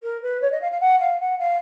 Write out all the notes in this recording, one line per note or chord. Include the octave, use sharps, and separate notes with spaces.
A#4
B4
C#5
D#5
F5
F5
F#5
F5
F#5
F5